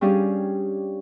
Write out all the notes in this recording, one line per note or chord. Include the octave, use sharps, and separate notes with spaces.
G3 C#4 D4 G4 G#4 F5